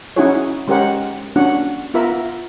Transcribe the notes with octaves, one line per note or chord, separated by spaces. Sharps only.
C#4 D#4 E4 F#4 G#4 C#5
G#3 C#4 G4 A#4 C5 F#5
A#3 C#4 D4 F#4 F#5
B3 F4 A#4 E5 B5